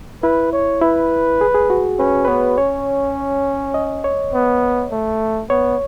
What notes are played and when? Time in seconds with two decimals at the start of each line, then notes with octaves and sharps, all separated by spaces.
0.23 E4 B4
0.53 C#5
0.81 E4 B4
1.41 G#4
1.55 G#4
1.70 F#4
1.99 C#4 B4
2.25 B4
2.28 B3 C#5
2.57 C#4 C#5
3.74 D#5
4.04 C#5
4.33 B3
4.91 A3
5.50 B3 C#5